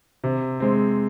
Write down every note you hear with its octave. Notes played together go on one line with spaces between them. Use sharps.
C3
G#3 C4